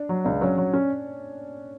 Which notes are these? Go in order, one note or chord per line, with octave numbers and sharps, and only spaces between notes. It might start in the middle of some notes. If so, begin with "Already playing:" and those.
Already playing: D4
F#3
C#2 D4
F#3 C#4
F#3
C#4